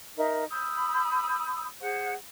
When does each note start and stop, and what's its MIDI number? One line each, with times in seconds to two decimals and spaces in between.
0.16 0.44 63
0.16 0.44 70
0.16 0.44 76
0.49 1.64 83
0.49 1.64 87
0.49 1.64 88
0.49 1.64 91
1.80 2.12 68
1.80 2.12 72
1.80 2.12 78